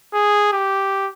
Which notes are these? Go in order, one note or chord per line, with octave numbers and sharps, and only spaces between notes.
G#4
G4